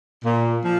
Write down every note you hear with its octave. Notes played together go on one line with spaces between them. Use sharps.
A#2
F3